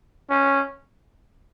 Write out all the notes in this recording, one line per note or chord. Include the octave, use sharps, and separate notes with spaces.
C#4